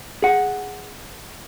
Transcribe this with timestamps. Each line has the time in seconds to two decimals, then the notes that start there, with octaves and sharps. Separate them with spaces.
0.22 G#4 F#5